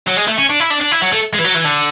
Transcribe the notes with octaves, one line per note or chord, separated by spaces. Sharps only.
F#3
G#3
A3
C#4
D4
E4
D4
D4
E4
F#3
A3
G#3
E3
F#3
E3
D3